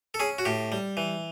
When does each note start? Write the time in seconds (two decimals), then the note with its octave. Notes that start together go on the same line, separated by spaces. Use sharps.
0.14 A4
0.20 C#4 G#4
0.38 F#4
0.45 A2 G4
0.72 G3
0.97 E3